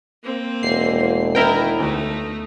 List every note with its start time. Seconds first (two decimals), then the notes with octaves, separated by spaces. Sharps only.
0.23 A#3 C4
0.63 E1 C7
1.35 D#3 B3 E4 A#4 G5
1.79 D2 A3 D#4